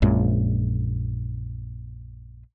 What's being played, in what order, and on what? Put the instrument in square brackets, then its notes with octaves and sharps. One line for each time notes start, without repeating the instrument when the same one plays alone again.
[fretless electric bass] A#1 F#2 A#2 G#3